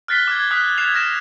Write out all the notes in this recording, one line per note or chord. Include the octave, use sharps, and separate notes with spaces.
F6 F#6 A6 B6 C7 G7
D6 F6 G#6
D#6 F6 F#6 B6
F#6 G#6 C7 E7 F7
F6 A#6 E7